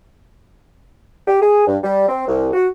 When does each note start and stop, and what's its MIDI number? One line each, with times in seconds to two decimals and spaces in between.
1.28 1.41 67
1.42 1.64 68
1.67 1.78 43
1.84 2.06 55
2.09 2.26 60
2.28 2.49 36
2.53 2.68 66